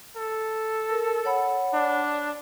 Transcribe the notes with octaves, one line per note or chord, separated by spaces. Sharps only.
A4
A#4
C#5 F#5 B5
D4